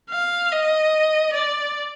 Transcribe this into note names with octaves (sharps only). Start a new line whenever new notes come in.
F5
D#5
D5